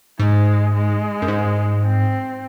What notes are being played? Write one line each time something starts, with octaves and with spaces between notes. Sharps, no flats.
G#2 G#3
G#3
F#2
G#2
C4